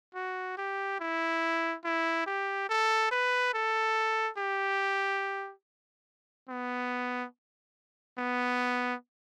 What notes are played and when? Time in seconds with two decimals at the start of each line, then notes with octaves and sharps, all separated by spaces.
0.15 F#4
0.58 G4
1.00 E4
1.85 E4
2.27 G4
2.69 A4
3.11 B4
3.54 A4
4.38 G4
6.49 B3
8.18 B3